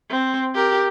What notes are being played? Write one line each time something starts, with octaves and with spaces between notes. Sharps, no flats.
C4
G4 A#4